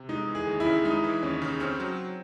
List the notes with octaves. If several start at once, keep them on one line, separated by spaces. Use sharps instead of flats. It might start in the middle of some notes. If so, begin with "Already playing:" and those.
Already playing: C3
G#3 D#4
E3
G#4
D#2
E4
C#3
G#3 D#4
E3
D#2 C#4
C#3
C4 C#4
F#3